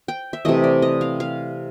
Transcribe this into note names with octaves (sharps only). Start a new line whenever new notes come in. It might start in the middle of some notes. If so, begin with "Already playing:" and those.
G5
E5
C3 E3 A3 D#5
D5
D#5
F5
F5